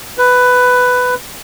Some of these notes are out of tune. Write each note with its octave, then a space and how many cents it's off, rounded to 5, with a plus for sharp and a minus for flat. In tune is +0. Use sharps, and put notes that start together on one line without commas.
B4 +10